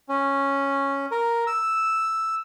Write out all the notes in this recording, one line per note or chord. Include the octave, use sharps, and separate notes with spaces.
C#4
A#4
E6